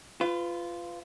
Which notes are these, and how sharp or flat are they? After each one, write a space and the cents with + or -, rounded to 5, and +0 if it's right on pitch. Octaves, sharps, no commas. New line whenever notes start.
F4 -10 B4 +25